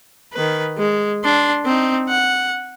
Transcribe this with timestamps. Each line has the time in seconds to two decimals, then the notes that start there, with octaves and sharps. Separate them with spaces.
0.33 D#3 B4
0.78 G#3
1.24 D4 C6
1.65 C4 D#4
2.09 F#5